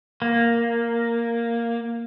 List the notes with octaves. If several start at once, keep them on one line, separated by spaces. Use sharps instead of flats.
A#3